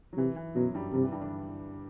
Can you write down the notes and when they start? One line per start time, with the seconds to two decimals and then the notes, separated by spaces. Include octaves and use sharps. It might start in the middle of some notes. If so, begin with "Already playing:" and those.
0.13 F#3
0.17 C3 E3
0.36 E3
0.55 F#2 B2 F#3
0.74 G2 G3
0.93 G2 C3 G3
1.03 E3
1.12 G2 G3
1.22 D3 D4